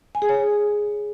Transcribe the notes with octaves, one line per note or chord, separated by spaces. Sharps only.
G#5
G#4
C#5